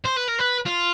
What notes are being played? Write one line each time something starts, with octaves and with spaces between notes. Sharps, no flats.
C5
B4
A#4
B4
F4